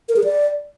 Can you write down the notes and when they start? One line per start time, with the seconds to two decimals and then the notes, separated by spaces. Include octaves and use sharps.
0.09 A#4
0.16 G#4
0.24 D5